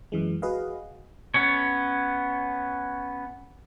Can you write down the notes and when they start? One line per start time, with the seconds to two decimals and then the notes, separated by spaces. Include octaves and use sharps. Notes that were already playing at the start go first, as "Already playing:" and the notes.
0.12 F#2 E3 G#3
0.42 F#4 G#4 B4 D#5 F5
1.34 B3 C#4 C#5